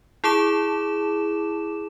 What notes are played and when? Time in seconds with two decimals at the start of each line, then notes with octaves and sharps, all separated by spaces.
0.24 E4 G#4 A5 D6 E7